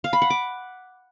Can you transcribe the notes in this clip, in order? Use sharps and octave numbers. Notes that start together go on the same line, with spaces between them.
F5
B5
F#5
D6